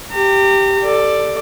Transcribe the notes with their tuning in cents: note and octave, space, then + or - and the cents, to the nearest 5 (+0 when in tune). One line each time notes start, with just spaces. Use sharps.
G4 +0 A#5 -35
A4 +15 D5 +10